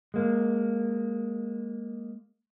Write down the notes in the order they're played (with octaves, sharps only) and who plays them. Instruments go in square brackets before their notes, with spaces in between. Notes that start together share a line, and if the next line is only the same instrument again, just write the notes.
[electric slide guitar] G#3 A#3